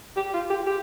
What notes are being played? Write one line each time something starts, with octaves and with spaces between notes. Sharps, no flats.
G4
F4
G4
G4